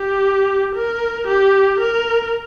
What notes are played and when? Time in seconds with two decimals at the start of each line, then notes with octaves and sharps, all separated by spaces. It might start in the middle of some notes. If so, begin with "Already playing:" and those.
Already playing: G4
0.75 A#4
1.28 G4
1.80 A#4